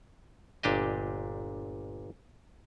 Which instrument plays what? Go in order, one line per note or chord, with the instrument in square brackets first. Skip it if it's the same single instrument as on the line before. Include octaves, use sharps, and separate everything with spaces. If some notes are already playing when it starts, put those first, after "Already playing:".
[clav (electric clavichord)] G1 A#2 D4 G4 D#5